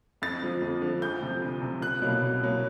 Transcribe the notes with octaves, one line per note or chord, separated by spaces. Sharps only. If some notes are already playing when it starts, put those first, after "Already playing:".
F2 A6
D3 F3
F2
D3 F3
D2 G6
C3 F3
D2
C3 F3
C2 F#6
B2 F#3 A#3
C2
B2 F#3 A#3